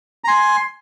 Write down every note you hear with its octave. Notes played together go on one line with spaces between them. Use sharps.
A#5
G#5 C6